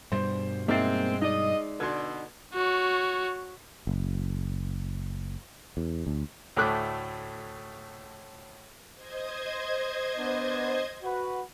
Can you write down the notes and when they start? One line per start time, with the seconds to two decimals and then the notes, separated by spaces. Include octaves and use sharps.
0.12 G2 B2 G3 C5
0.68 G#3 A#3 C4 D#4 E5 A6
1.22 D#4 D5 D#5
1.80 B2 D3 C6 G#6
2.54 F#4 C#5
3.87 F#1
5.77 E2
6.07 D2
6.56 D2 A2 A3 D6 F#6
8.95 C5 D#5 G#6
10.17 B3 D4
11.03 F#4 B4